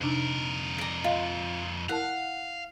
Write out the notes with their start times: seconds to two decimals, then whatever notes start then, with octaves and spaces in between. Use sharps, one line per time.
0.01 F2 C3 D4 D#4 A#4
0.78 D5 A#5
1.04 F4 D#5
1.89 E4 A#4 F5 F#5 A5